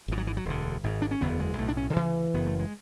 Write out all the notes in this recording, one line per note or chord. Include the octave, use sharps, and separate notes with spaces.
G#1 G#2 E3
F#3
E3
F#3
E1 D2 D3
G#1 G#2
D4
C#4
F#1 E2 D3 B3
G#3
B1 A2 A3
D4
C#4
D3
D2 C#3 E3
F#1 F#2 C#3 B3
A3
G#3